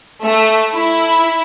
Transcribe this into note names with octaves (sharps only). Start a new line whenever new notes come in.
A3
E4